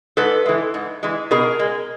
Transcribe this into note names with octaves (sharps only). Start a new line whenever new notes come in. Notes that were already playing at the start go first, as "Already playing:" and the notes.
G#2 A4 B4
E3 G#3
G#2
E3 G#3
B2 G#4 A#4
G#3